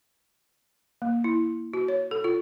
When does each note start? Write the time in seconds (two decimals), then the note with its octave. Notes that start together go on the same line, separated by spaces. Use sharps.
1.02 A#3
1.24 E4
1.74 F#4
1.88 C#5
2.11 A4
2.24 F4